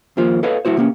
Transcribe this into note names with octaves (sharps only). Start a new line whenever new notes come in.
D#2 F3 A#3 F4 C5
A4 B4 C#5 D#5 F5
A3 E4 F#4 C5
C3 A#3 C#4